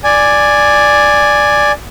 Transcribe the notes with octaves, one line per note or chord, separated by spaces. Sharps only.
D5 G#5